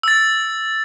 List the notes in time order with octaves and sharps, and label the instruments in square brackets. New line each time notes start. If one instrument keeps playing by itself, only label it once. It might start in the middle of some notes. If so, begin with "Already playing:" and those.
[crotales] E6 A6